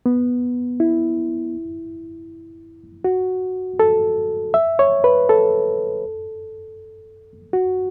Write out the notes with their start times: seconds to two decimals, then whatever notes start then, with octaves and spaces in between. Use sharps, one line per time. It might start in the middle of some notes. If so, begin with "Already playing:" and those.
0.06 B3
0.80 E4
3.04 F#4
3.80 A4
4.54 E5
4.79 C#5
5.04 B4
5.29 A4
7.53 F#4